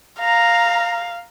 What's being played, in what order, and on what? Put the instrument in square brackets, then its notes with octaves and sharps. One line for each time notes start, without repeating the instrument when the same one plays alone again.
[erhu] F5 [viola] A#5